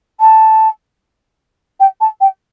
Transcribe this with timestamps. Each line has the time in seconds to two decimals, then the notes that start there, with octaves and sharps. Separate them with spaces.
0.20 A5
1.80 G5
2.01 A5
2.21 G5